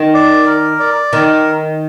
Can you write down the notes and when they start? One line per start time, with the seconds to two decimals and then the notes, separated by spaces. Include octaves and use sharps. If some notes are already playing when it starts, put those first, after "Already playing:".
Already playing: D#3
0.14 D5
0.46 A#4
0.80 D5
1.13 D#3 A#4